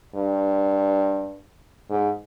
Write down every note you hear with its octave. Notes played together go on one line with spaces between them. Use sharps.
G2
G#2